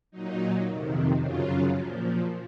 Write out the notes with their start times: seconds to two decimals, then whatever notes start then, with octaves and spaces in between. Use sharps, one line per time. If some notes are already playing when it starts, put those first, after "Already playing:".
0.11 A#2 F#3 D#4
0.66 F2 C3 D#3
1.20 F#2 C#3 F#3 F4
1.75 A#2 F3